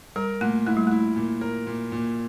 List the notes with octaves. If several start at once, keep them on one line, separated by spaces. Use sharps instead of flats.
G3 A#4
A#2 A3
A3 E4
G3
A3 E4
A#2
A#4
A#2
A#2